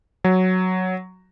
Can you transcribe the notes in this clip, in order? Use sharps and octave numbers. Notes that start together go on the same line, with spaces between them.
F#3